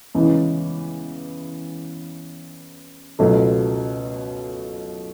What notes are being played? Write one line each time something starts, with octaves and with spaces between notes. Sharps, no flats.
E2 C#3 E3 G#3
C#2 B2 F#3 A3